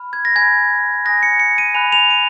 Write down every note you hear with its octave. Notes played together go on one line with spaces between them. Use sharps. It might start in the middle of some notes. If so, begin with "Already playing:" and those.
Already playing: B5 F6
G#6
A#6
G#5 B5 F#6 G#6
G#5 D#6 F#6 A#6
C#7
C#7
D#7
G#5 B5 F#6 F7
F7
D#7